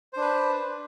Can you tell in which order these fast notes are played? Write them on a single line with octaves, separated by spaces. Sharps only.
C5 D4 B4